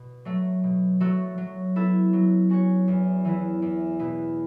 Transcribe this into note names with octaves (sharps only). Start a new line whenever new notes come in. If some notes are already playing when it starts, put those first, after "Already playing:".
Already playing: B2
F#3 A3
B2
F#3 A3 F#4 A4
F#3
B3 E4 A4
F#3
C#4 F#4 C#5
E2
E3 B3 E4
E2
B2 B3 E4